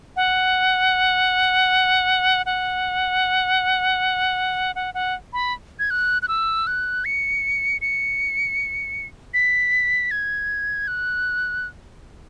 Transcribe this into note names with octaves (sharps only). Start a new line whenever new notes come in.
F#5
F#5
F#5
F#5
B5
G#6
F#6
F#6
E6
F#6
C#7
C#7
B6
G#6
F#6